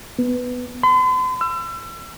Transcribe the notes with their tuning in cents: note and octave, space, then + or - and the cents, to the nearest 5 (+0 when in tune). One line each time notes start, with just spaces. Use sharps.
B3 +5
C6 -45
E6 +35